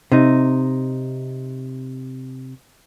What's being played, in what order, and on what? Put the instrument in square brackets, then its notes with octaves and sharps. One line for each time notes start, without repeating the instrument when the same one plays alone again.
[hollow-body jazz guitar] C3 D#4